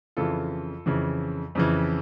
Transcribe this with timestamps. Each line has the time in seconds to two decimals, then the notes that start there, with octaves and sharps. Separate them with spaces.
0.17 F2 C#3 E3 F4 A4
0.86 F2 C#3 E3
1.55 F2 C#3 E3